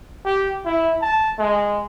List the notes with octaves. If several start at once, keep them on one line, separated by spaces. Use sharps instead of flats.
G4
E4
A5
G#3